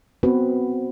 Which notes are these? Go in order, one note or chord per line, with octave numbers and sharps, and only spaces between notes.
B3 C4 F#4 B4